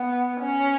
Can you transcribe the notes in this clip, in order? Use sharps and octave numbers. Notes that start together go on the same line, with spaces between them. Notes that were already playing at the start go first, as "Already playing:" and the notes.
Already playing: B3
C#4